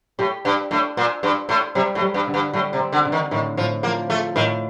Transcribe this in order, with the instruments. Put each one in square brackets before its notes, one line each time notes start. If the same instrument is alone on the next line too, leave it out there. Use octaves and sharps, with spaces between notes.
[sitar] A2 [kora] G4
[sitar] G2 [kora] D4
[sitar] A2 [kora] D4
[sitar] A#2 [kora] C5
[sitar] G2 [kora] C5
[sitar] A2 [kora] C5
[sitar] C3 [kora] G3
[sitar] A2
[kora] G3
[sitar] G2
[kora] D3
[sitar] G2
[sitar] A2 [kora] G3
[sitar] C3
[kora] C4
[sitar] D3
[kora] D3
[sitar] D#3
[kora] A2 [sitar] D#3
[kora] A2 [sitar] F3
[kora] F3 [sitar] A#3
[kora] F3 [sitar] A3
[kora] A2 [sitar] D#3